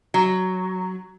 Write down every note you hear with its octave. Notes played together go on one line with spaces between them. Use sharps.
F#3